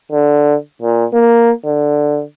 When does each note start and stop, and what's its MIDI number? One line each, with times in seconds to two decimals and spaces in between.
0.12 0.55 50
0.82 1.05 46
1.13 1.51 58
1.65 2.22 50